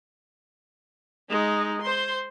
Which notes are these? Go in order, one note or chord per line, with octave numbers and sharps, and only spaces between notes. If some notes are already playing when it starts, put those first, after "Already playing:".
G#3 D#4
C5 C6